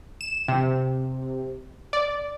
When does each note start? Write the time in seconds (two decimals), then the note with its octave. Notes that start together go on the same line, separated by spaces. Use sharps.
0.21 E7
0.48 C3
1.93 D5